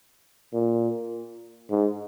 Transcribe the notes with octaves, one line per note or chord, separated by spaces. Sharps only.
A#2
G#2